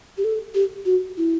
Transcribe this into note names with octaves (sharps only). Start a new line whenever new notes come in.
G4
A4
G4
F#4
E4